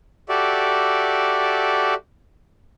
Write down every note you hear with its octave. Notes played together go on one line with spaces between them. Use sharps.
F#4 G4 A4 D5 E5